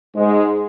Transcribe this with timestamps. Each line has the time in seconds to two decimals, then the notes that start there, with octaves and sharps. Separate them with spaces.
0.15 G#2 G#3